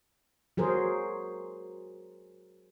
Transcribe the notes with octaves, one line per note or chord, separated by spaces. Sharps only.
F#3 G#4 A#4 C5